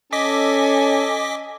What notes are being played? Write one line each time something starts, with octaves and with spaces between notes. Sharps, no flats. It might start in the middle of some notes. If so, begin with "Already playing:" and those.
C#4 A4 D#5 G#5 D6 B6